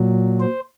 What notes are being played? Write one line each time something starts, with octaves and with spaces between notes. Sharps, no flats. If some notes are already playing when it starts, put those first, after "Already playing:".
Already playing: A#2 F#3
C5